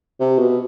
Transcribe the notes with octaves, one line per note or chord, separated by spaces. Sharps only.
C3
B2